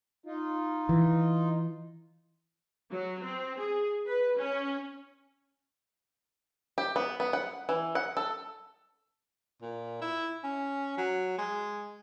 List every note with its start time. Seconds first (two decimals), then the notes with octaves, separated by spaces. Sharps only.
0.26 D#4 F4
0.89 E3
2.91 F#3
3.23 C4
3.58 G#4
4.06 B4
4.37 C#4
6.78 G4
6.96 B3
7.20 B3
7.33 F#5
7.69 E3
7.95 F#5
8.17 A4
9.62 A#2
10.02 E4
10.44 C#4
10.98 F#3
11.39 G#3